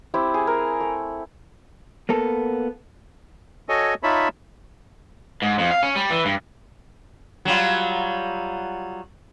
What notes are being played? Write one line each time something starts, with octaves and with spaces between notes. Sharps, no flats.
C4 E4 G4
G#4
A#4
A3
A#3 B3 A4
F#4 A4 C#5 D#5 G#5
D#4 F4 C#5 E5 A5 B5
G#2
F2
F5
C#4
G3
E3
G2
F#3 G3 F4